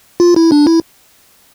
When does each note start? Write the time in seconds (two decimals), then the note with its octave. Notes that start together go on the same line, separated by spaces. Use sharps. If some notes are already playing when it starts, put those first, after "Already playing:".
0.20 F4
0.36 E4
0.52 D4
0.67 E4